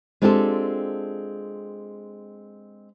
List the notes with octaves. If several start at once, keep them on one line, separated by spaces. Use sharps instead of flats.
G#3 C4 D4 F4 G4 A4